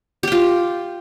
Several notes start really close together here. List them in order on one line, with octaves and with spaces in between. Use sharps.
G4 G5 F4